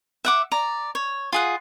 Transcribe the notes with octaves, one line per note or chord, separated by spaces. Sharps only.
E5 F#5 D6
D5 A#5
C#5
F4 G#4 F#5